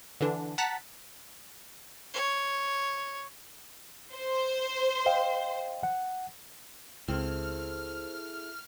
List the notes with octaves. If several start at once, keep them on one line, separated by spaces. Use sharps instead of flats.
D3 E3 D4
F#5 A5 A#5 F#6 A6 B6
C#5
C5
D#5 F5 G5
F#5
C#2 C4 E4 G#4 A4 F6